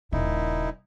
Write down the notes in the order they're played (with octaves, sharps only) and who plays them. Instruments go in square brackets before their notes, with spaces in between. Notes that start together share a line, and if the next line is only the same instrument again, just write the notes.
[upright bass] D#1 C#3 [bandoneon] A#2 D#4 E4